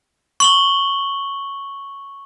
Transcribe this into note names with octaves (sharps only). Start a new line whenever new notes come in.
C#6 F#7 G7